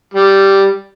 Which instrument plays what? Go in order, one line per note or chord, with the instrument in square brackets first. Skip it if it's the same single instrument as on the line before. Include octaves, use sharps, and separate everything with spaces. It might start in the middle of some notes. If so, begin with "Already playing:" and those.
[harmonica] G3